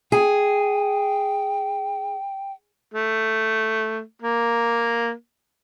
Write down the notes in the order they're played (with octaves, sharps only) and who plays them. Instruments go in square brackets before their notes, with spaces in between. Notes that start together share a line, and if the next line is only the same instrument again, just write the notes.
[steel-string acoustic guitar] G#4 [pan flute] G5
[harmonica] A3
A#3